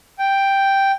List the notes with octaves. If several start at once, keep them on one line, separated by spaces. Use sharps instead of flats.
G5